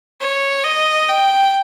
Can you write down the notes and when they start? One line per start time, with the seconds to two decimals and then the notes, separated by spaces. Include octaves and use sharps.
0.21 C#5
0.64 D#5
1.08 G5